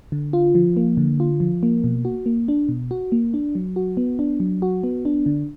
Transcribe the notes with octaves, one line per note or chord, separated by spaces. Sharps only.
D3
F4
F3
A#3
D3
F4
F3
A#3
B2
F#4
A#3
D4
B2
F#4
A#3
D4
F#3
F#4
B3
D4
F#3
F#4
B3
D4
D3